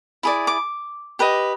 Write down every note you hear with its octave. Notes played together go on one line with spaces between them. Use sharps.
E4 G#4 D5
D6
G4 B4 D#5